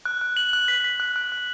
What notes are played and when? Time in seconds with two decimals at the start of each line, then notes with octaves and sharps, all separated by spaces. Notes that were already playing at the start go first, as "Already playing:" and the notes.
0.05 F#6
0.21 F#6
0.37 F#7
0.53 F#6
0.68 B6
0.84 B6
1.00 F#6
1.16 F#6
1.32 F#6